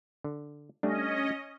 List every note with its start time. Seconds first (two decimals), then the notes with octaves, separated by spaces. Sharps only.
0.24 D3
0.83 G3 A3 C#4 D4 D#5